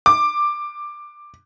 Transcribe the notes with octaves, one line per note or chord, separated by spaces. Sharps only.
D6